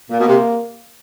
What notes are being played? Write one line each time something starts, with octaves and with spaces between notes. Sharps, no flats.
A#2 A#3
B2
C3